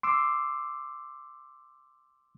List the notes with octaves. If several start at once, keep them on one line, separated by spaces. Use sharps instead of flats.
C6 D6 E6